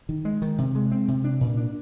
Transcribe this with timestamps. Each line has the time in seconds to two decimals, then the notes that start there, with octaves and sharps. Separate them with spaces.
0.09 D#3
0.25 G#3
0.42 D#3
0.58 C3
0.75 G#3
0.92 C4
1.08 C3
1.24 D4
1.41 A#2
1.57 D4